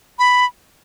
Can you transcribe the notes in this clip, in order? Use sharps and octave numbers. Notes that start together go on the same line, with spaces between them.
B5